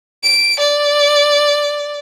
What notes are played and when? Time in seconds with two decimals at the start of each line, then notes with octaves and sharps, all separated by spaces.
0.23 D7
0.59 D5